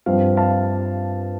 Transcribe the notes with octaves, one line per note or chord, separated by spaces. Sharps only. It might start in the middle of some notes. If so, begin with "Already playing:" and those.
G2 F3 C4 F5
F5 A5